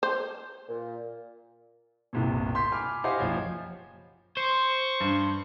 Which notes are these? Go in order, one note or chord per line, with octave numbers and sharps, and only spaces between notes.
C5
A#2
G1 C2 A#2
C6 G6 B6
G#5 B5 D6 F6
G4 C5 D#5 F5 F#5 G#5
F#1 F3 C#5
C5 C#6
G2